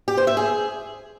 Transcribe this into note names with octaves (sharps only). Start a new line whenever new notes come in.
G4
C5
E5
G#4